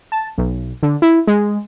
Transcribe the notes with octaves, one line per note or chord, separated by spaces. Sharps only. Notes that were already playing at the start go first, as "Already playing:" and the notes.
A5
B1
D3
E4
G#3